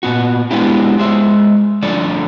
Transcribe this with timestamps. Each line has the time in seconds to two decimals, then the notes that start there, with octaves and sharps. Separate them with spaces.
0.03 A#2 B3 F#4
0.51 G#3 B3 C4 D4 E4 G4
0.98 G#3 C5 E5
1.83 D3 F3 A3 A4 D5